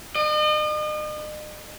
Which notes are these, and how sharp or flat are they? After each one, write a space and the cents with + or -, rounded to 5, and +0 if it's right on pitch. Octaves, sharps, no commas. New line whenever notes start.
D#5 -40